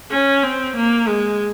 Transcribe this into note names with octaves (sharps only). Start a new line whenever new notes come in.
C#4
C4
A#3
G#3